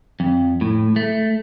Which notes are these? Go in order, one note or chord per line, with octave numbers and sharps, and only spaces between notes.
F2
A2
A3